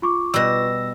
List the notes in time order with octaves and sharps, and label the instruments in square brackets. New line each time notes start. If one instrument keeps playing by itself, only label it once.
[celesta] F4 C#6 D6
[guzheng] B2 G3 [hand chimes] E6 A#6